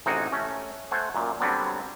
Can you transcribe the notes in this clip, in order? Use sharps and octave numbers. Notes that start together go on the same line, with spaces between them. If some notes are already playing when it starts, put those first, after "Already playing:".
A1 C3 D#4 F#4 G#4 A#4
A3 C#4
A3 C5 F#5 G#5
F#2 A#2
D3 F#3 G3 B3 C4 D4